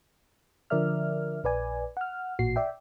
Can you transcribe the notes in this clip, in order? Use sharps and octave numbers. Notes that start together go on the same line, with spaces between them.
D3 F3 A#4 D5 E5 F6
A#1 B4 D5 G#5
F#5 F6
A1 A#2 F#4 C7
D5 E5 G5